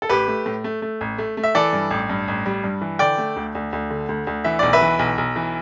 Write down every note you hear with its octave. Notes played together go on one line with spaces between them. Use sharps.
A4
A1 G4 B4
A3
A2
A3
A3
A1
A3
A3
E5
E3 A4 D5
G2
A1
G2
A1
G3
G2
E3
D3 D5 G5
A3
D2
D2
D2
D3
D2
D2
E3 E5
B1 D5
B4 E5
E3
B1
B1
E3